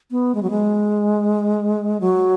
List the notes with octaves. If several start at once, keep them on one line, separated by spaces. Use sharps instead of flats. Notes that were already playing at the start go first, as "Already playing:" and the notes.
B3
G#3
F#3
G#3
F#3